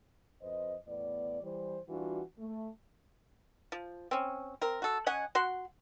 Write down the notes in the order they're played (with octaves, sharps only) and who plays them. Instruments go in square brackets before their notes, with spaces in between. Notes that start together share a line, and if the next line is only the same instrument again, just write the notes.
[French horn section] F2 B4 C5 D#5
E2 A2 B3 D5
E3 G3 C5
E3 G3 D4 F4 F#4
A3
[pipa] F3
C4 C#4
C4 A#4
F#4 A4
C#4 D#5 F#5 G#5
F#4 F#5 C6